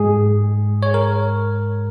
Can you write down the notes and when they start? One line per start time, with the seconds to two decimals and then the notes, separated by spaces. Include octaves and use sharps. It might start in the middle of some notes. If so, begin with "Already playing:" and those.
Already playing: G#2 G#3 G#4
0.83 C#5
0.94 A#4